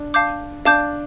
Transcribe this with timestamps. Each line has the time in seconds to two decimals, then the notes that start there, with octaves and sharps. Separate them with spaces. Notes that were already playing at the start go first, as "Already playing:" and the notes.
Already playing: D4
0.14 F5 A5 D6 G6
0.65 D4 F5 A5 D6 G6